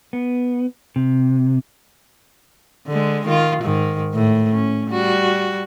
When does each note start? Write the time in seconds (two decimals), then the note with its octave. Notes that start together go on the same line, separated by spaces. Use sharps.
0.13 B3
0.96 C3
2.87 D3 G#3
3.26 D#3 F4
3.62 G#2 D#3
4.14 A2
4.52 C#4
4.90 G3 F#4